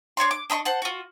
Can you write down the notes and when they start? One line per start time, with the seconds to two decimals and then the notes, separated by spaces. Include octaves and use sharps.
0.17 D4 C#5 D5 C6
0.31 D6
0.50 D4 D#5 B5 C#6
0.65 C5 F#5 A5
0.82 F4 F#4